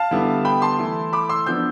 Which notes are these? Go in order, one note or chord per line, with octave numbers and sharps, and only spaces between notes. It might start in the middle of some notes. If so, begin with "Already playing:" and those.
Already playing: F5 A5
D3 G3 B3 E4
G5 B5
A5 C6
E3 A3 E4
B5 D6
C6 E6
F3 B3 D4 E6 G6